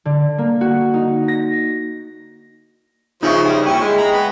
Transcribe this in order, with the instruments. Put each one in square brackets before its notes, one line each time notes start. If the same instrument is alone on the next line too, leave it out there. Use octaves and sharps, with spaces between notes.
[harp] D3
A#3
F#4
D#4
A#6
[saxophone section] C#3 [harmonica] F3 C5 [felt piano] D#4 E5 C#6
[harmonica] G3 [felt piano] G4
[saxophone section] D#2 C#4 [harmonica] E4 [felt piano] G5 C#6
[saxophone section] G#3
[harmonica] A#5 B5
B3 B5